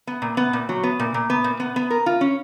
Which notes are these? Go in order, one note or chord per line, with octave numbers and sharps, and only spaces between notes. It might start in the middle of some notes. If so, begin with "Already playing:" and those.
B3
A#2
B3
A#2
F#3
B3
A#2
A#2
B3
A#2
B3
B3
A#4
F4
C#4